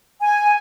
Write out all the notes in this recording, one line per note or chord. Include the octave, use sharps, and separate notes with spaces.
G#5